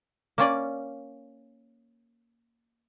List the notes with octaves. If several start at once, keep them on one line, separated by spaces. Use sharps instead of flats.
A#3 C#4 D5